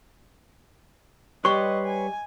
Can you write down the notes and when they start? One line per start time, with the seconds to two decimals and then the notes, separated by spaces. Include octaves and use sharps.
1.45 G3 G4 B4 C#5 D#5 C6 C#6
1.85 G#5